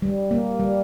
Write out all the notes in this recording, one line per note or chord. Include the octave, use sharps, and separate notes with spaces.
G3
A#3
G3